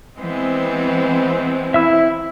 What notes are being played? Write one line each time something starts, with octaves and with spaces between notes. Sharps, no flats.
E3 G#3 B3 C4
E4 E5 E6